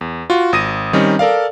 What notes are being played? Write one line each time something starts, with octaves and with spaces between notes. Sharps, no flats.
E2
F4 F#4
G#1 D#6 A#6 D#7
D#3 G3 C4 C#4 D#4
A4 A#4 D5 F5